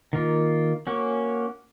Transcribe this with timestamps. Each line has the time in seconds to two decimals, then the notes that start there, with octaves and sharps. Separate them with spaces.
0.13 D#3 A#3 F4
0.87 A#3 C#4 F#4